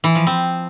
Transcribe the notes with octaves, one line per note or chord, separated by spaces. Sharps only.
E3
F3
C4